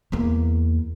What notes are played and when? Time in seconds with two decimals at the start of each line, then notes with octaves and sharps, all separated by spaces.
0.12 E2 A#3